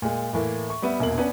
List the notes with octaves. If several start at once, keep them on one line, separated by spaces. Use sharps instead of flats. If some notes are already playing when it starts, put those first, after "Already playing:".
A#2 G#3
A2 E3 A#3
C#6
G3 B3 E5
E1 A#1 B2 A#3 F#7
B3 C#4 D4 B4